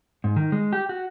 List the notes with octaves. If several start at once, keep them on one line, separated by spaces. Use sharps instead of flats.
G#2
D#3
G#3
G4
F#4